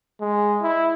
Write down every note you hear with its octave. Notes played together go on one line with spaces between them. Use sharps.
G#3
E4